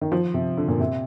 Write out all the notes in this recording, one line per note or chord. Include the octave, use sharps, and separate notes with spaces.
D#3
F3
C3
D3
A#2
C3